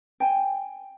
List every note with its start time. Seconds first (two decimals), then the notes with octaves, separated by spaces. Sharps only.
0.20 G5 G#5